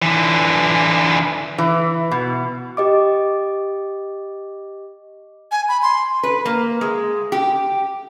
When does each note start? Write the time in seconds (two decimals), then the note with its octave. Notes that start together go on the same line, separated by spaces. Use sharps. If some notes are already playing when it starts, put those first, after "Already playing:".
0.02 D3 E3
1.58 E3
2.11 B2
2.77 G4 D#5 D6
5.52 G#5
5.68 B5
5.82 C6
6.23 B4
6.45 A#3
6.81 G#3
7.32 G4